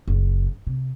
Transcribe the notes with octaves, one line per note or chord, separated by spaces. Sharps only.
F#1
C3